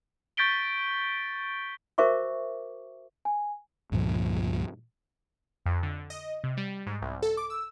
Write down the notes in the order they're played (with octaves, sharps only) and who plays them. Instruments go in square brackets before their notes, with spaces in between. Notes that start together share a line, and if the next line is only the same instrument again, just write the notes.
[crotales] C#6 G6 A6 B6 D7 G7
[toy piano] F#4 A#4 C5 E5 C#6 D6
[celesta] G#5
[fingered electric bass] C#2 G2 A#2 F3
[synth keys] F2
D3
D#5
C3
G3
G#2
C2
A4
D6
E6